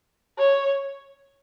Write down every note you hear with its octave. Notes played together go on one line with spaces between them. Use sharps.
C#5